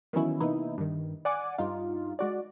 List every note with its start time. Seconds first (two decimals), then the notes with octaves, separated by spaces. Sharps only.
0.13 D#3 E3 F#3 B3 C#4 E4
0.40 C3 E3 A#3 B3 D#4 E4
0.78 G2 D#3
1.25 D5 F#5 G#5 D6
1.58 G2 D#4 F4
2.19 G#3 F#4 D5